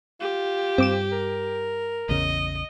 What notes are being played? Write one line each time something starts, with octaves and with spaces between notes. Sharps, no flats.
F4 G4
G2 C4 D6 E7
A#4
A1 E2 C#3 D#5